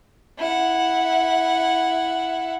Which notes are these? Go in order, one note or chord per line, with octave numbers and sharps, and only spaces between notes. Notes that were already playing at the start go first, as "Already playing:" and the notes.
E4 F#5